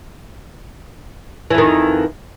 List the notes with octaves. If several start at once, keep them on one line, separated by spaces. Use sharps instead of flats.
F2 D#3 E3